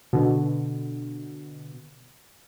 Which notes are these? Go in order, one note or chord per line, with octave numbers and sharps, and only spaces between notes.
B2 D3